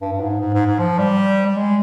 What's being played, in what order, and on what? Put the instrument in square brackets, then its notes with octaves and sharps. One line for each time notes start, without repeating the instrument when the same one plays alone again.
[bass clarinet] G2
G2
G#2
G#2
G#2
G#2
F3
G3
G3
G#3